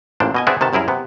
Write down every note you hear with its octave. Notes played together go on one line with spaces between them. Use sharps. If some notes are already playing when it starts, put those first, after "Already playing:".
A1 A#2 D4 C5
B2 D#5 G#5
B3 C4 D4 G#4 E5
C3 D#3 B3 A5
C2 F#2 E4 G#4 A#4
C3 B3